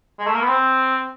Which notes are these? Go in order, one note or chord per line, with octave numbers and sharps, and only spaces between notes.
G#3
A3
A#3
B3
C4